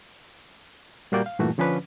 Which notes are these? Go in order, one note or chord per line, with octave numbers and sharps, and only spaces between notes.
A#2 G3 A#3 F#4 D5 G6
F5
G2 A#2 E3 A3 F#4
D3 F3 C#4 D4 B4